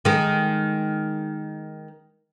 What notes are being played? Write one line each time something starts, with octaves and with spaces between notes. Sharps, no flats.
D#3 G#3